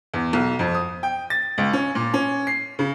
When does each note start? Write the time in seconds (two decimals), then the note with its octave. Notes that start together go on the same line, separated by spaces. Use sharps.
0.14 E2
0.33 B1
0.59 F2
0.74 D#6
1.03 G5
1.30 A6
1.58 C#2
1.73 C#4
1.95 A#2
2.14 C#4
2.47 C7
2.79 C#3